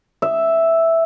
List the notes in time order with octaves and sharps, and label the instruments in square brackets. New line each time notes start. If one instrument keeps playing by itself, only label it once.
[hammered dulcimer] E5